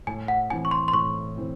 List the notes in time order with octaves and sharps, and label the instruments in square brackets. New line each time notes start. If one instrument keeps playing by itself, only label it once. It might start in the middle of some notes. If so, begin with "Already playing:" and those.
[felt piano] A2 [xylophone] G#5
[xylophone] F#5
[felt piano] E3 C4 E4 [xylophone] G#5
[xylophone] C#6
C6
C6
[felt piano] A2 [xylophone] C#6
[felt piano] E3 C4 E4